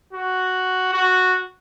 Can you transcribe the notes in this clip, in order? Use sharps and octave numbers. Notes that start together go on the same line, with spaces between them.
F#4
F#4